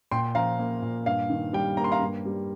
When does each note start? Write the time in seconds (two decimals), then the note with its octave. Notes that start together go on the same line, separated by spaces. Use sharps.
0.11 A#2 G5 C6
0.35 F3 F5 A#5
0.59 A#3
0.82 A#2
1.06 G2 F5
1.30 D#3
1.53 G3 G5
1.77 A#3 A#5
1.84 C6
1.92 F5 A#5
2.01 G2
2.25 G3